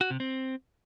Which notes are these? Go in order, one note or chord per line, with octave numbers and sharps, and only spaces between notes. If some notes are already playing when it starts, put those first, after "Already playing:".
F#4
C3
C4